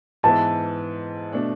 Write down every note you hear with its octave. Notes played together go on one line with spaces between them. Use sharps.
G#2 E3 B3 E4 A5
B2 A3 D4